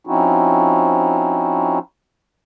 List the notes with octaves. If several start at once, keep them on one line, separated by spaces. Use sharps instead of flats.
F3 C4 C#4 D#4 E4 F#4